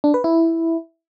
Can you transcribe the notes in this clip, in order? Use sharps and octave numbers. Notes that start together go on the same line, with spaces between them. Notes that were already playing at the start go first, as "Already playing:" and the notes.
D4
B4
E4